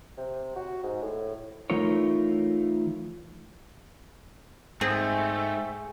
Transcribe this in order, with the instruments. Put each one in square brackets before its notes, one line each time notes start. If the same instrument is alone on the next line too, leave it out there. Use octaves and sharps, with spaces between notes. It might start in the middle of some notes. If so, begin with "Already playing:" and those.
[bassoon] C3
F#4
G#2
A2
[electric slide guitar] E3 A3 D#4 F4 A#4 C#5
[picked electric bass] G#2 [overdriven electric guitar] A3 [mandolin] C4 [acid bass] G#4